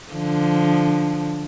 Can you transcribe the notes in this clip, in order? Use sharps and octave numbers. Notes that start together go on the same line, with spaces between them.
D3 F3